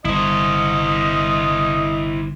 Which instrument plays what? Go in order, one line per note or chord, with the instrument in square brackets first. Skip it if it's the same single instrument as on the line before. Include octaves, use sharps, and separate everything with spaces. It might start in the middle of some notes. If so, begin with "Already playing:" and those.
[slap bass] G1 [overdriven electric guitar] E4 C5 [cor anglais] D#5